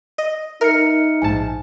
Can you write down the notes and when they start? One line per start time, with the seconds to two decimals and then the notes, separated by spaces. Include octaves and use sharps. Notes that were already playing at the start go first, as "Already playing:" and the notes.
0.18 D#5
0.61 D#4 A#4 E5 F6 C#7
1.22 A#1 G#2 G#5 A5